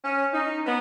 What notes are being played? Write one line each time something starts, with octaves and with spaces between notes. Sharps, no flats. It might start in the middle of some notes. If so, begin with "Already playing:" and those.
C#4
D#4
B3